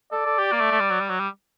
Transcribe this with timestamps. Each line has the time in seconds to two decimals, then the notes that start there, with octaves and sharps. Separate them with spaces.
0.12 A4 D5
0.26 A4
0.38 G4
0.52 A#3
0.61 A3
0.71 A3
0.80 G3
0.90 F#3
1.00 G3
1.10 F#3
1.20 G3